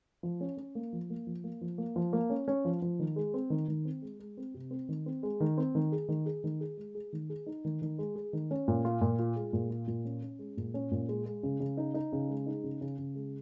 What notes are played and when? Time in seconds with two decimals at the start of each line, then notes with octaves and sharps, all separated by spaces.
0.23 F3
0.41 C#4
0.57 C#4
0.75 A#3
0.93 F3
1.10 A#3
1.27 F3
1.44 A#3
1.61 F3
1.78 A#3
1.96 F3
2.13 A#3
2.30 C#4
2.48 C#4
2.65 F3
2.82 F3
2.99 D#3
3.16 G#3
3.34 C4
3.50 D#3
3.68 D#3
3.85 C4
4.02 G#3
4.20 G#3
4.37 C4
4.54 C3
4.71 C4
4.89 D#3
5.06 C4
5.23 G#3
5.40 D#3
5.58 C4
5.75 D#3
5.92 G#4
6.08 D#3
6.26 G#4
6.44 D#3
6.61 G#4
6.77 G#3
6.95 G#4
7.13 D#3
7.30 G#4
7.46 D#4
7.65 D#3
7.82 D#3
7.99 G#3
8.15 G#4
8.33 D#3
8.51 C#4
8.68 A#2
8.85 F4
9.01 A#2
9.19 F4
9.36 G#3
9.53 A#2
9.71 F4
9.87 A#2
10.05 C#4
10.22 C#4
10.39 G#3
10.57 A#2
10.74 C#4
10.91 A#2
11.09 G#3
11.26 G#3
11.43 C#3
11.60 C#3
11.77 D#4
11.94 D#4
12.12 C#3
12.29 G#3
12.46 D#4
12.63 C#3
12.81 C#3
12.98 C#3
13.15 G#3